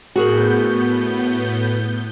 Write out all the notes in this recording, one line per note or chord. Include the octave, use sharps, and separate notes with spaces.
A2 B3 F#4 G#4 A#4 G6